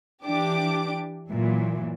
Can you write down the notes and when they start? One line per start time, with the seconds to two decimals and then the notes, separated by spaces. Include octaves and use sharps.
0.24 E3 D4 G4 D6
1.28 A#2 E3 F#3